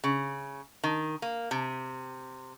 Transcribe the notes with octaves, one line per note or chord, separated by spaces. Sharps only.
C#3
D#3
A#3
C3